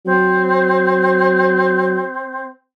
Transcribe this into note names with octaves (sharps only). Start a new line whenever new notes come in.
F#3 C4